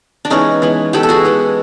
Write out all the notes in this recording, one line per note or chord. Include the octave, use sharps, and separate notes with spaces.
D4
E3 G#3 B3 C#4 D#4
E3 G#3 B3
E3 G#3 B3 G4 A4
A4
F#4 G#4
E3 G#3 B3